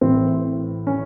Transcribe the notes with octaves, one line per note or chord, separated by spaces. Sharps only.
A1 A2 E3 C4
C#4